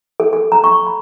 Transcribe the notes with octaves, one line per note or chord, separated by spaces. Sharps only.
A4
A4
A#5
C#6
B5